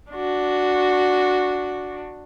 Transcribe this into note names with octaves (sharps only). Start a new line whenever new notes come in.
D4 F#4